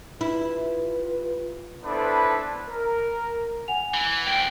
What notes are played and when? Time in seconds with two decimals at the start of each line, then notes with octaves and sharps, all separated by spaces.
0.21 E4 F4 G4 B4
1.84 B3 D4 E4 A4 B4 C5
2.67 A#4
3.68 F#5 G#5 F7
3.94 E3
4.26 C2 G5 D7